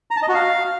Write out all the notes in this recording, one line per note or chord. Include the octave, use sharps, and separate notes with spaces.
A#5
A5
D#5
F#4
F5